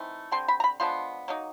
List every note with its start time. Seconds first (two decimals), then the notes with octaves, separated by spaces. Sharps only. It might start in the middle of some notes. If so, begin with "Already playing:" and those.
Already playing: E3 A3 C4 D#4
0.32 D3 G3 C4 C6
0.48 B5
0.60 A#5
0.64 B5
0.80 F3 G#3 B3 D4 C6
1.28 F#3 A#3 D#4